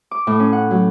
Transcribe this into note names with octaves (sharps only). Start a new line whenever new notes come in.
D6
A2
C#4
F#5
F#3